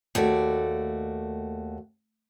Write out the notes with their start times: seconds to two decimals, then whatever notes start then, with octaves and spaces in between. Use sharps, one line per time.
0.15 D#2 A3 F#4 D5